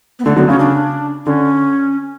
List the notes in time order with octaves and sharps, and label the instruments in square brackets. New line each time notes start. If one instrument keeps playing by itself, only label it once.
[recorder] B3
[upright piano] D3 [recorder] A3
[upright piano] D3 F#3 [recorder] B3
[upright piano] C#3 [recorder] C#4
[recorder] D4
[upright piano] D3 [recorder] C#4